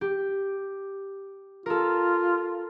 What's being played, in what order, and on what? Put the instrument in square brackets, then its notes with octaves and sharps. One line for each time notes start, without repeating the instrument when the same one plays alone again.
[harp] G4
[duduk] F4 [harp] A4 A#4